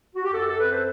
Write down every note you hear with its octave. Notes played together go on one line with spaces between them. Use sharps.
F#4
G4
F#2 F#4 A4
A4
C4 B4
A4 C5